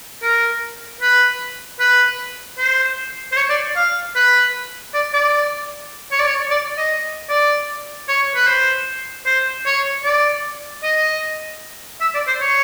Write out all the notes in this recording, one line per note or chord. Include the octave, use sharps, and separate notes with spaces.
A#4
B4
B4
C5
C5
C#5
D5
F5
B4
D5
D5
C#5
D5
C#5
D5
D#5
D5
C#5
B4
C5
C5
C#5
D5
D#5
E5
D5
C5
C#5